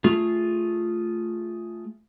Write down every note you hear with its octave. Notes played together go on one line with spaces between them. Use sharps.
A3 F4 G#4